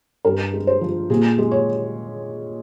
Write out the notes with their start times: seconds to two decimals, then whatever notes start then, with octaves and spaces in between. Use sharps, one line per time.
0.25 G2 A#4
0.53 G#3
0.67 C5
0.81 F3
1.10 A#2 G#4
1.39 G#3
1.51 C#5